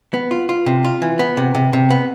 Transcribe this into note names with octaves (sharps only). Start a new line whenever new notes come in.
B3
F4
F4
C3
F4
E3
B3
C3
C3
C3
B3